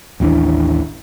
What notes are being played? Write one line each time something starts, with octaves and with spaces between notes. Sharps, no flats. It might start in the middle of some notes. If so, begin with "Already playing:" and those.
A1 D#2 E3 D4